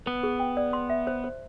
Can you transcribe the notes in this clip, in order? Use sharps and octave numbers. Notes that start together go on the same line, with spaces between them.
B3 B4
G#4
G5
D5
C6
E5
C5
C5